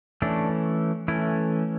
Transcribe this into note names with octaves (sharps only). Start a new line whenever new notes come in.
E3 A3 C#4 D4
E3 A3 C#4 E4